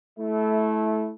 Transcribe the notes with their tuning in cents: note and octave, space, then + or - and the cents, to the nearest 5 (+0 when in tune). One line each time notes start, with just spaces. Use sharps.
A3 -20 E4 -10